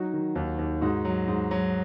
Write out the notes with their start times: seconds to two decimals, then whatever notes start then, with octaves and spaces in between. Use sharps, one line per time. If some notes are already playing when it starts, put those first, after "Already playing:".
Already playing: F#3 D#4 F#4
0.13 D#3
0.35 D#2
0.59 D#2
0.81 G#2 D#4 F#4
1.05 F#3
1.28 G#2
1.51 F#3